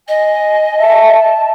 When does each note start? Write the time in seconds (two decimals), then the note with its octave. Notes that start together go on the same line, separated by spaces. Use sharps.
0.08 D#5 G#5
0.78 E5 A5